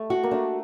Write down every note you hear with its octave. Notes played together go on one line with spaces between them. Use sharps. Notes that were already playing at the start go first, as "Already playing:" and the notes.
Already playing: A3
F#4
A#3
A3 D4